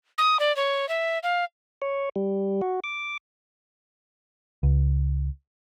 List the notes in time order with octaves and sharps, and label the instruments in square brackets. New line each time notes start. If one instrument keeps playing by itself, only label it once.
[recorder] D#6
D5
C#5
E5
F5
[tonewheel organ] C#5
G3
F#4
D6
[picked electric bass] C#2